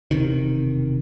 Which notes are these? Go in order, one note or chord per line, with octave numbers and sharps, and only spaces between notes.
E1 A#1 C3 D#3